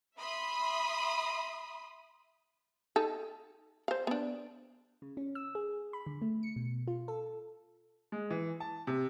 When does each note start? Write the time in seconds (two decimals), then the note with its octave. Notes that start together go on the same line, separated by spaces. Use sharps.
0.19 E5 B5 C6 D#6
2.96 D#4 A4
3.88 C5 F5
4.07 B3 D4
5.02 C#3
5.17 C#4
5.35 E6
5.55 G#4
5.93 B5
6.06 D3
6.22 A3
6.43 C#7
6.56 B2
6.88 F4
7.08 A4
8.12 G#3
8.30 E3
8.60 A5
8.87 C3